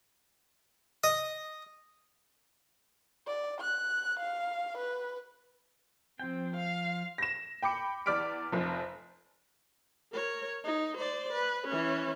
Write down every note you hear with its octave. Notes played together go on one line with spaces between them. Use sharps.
D#5
D5
F#6
F5
B4
F3 C4 G5
F5
A#6 E7
G5 B5 D6 C#7
E2 D5 D6 F6 B6 D7
F1 F3
A#4 C#5
D#4
C5 D5
B4
E3 C#4